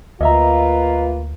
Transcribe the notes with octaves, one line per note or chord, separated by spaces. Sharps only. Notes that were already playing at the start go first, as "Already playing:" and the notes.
D2 A#3 F4 B4 D#5 E5 A#5